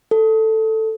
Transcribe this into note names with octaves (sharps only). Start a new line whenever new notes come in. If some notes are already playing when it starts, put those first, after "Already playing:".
A4